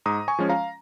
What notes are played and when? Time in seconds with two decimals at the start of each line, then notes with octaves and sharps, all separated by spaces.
0.06 G#2 A#5 D#6
0.28 G#5 C#6
0.39 F3 G#3 C#4
0.49 F5 A#5